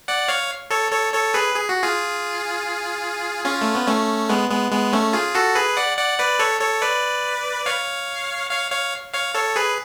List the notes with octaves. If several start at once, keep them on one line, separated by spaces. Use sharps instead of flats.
D5 F#5
C#5 F5
A4 C#5
A4 C#5
A4 C#5
G#4 B4
G#4
F#4
F4 G#4
C#4 F4
A3
B3
A3 C#4
G#3 B3
G#3 B3
G#3 B3
A3 C#4
F4 G#4
F#4 A4
G#4 B4
D5 F#5
D5 F#5
B4 D5
A4 C#5
A4 C#5
B4 D5
C#5 F5
C#5 F5
C#5 F5
C#5 F5
A4 C#5
G#4 B4